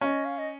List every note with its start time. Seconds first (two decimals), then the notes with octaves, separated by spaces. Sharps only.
0.01 C#4 D#5 F5
0.25 F5
0.38 D#5